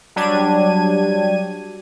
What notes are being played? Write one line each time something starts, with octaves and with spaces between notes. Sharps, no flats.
F#3 G3 D4 G4 G#6 D#7